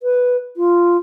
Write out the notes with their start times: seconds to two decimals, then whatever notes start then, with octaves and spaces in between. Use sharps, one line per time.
0.03 B4
0.57 F4